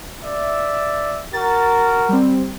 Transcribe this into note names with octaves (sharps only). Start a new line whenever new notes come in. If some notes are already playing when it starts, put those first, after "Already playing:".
D5 E5
F#4 A#4 A6
G3 C4